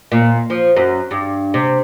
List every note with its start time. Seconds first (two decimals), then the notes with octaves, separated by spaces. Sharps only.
0.12 A#2
0.50 F3
0.76 F#2
1.11 G2
1.54 C3